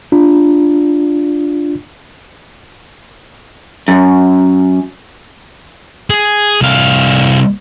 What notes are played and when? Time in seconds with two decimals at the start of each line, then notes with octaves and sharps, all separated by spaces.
0.12 D4 F4
3.88 F#2
6.10 G#4
6.61 C2 F5